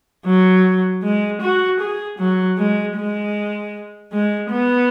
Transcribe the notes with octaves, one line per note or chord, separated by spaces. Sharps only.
F#3
G#3
F#4
G#4
F#3
G#3
G#3
G#3
B3